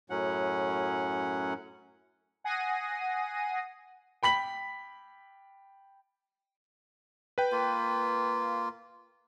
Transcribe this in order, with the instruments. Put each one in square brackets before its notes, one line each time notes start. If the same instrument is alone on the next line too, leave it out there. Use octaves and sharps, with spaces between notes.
[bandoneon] F#2 A2 F#3 C#4 F#5
[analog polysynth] F#5 G#5 D#6 A#6 C7 D#7
[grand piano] G5 B5 B6 F#7
[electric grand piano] B4 G5
[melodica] A#3 F4